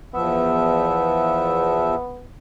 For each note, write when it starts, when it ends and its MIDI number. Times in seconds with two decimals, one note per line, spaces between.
0.14 1.95 40
0.14 1.95 53
0.14 2.27 59
0.14 1.95 76